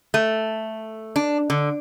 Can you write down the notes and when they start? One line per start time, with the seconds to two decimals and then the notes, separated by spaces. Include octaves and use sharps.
0.14 A3
1.16 D4
1.50 D3